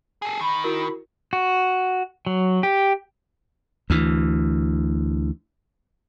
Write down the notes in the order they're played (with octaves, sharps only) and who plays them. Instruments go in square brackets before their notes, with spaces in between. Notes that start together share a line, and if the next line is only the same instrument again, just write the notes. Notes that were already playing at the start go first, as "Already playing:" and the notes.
[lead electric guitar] G#4 A4
[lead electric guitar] D#3 [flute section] B5
[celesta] E4 F#4 A#4
[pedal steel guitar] F#4
F#3
G4
[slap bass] D2 E3